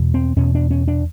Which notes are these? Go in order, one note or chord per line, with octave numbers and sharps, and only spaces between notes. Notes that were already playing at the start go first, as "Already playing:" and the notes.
Already playing: E2 B2
C4
E2 B2 C#4
D4
C#4
D4